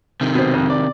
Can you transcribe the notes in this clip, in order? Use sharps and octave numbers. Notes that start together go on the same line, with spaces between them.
C3 D#3
B2 C5
F2
D5